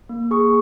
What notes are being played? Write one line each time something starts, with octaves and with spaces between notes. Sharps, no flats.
A#3
G#4 C#6